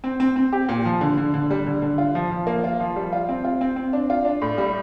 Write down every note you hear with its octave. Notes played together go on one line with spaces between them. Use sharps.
C4
C4
C4
G4
A#2
F3
D3
D3
D3
G3
D3
D3
F4
F3
F3
A#3
F4
F3
G3
F4
C4
F4
C4
C4
D4
F4
D4
A2
G3